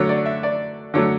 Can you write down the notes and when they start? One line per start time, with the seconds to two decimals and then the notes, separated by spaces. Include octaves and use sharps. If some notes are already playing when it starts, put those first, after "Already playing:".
Already playing: D3 F#3 A3 C#5
0.09 D5
0.26 E5
0.43 D5
0.94 D3 F#3 A3 C#5